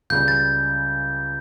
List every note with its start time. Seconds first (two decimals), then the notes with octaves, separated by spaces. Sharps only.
0.10 C#2 C#3 G3 G6
0.28 A6